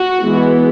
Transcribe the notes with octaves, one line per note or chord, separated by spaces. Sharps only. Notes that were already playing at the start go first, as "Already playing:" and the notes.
Already playing: F#4
E3 G#3 B3